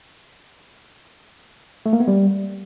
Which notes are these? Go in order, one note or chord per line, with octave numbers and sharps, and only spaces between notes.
A3
A#3
B3
G3